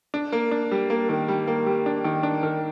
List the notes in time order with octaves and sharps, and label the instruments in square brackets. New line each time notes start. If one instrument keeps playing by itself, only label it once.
[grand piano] D4
A#3
D4
G3
A#3
D#3
G3
A#3
G3
D4
D#3
D4
D#3